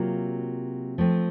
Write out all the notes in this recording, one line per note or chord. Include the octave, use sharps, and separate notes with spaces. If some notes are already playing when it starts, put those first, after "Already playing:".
Already playing: C3 F#3 A#3 F4
F3 A3 C4